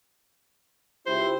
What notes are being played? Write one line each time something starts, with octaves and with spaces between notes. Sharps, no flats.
C#2 E4 G4 C5